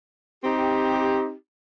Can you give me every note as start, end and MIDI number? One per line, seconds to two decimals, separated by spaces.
0.44 1.33 60
0.44 1.33 63
0.44 1.33 67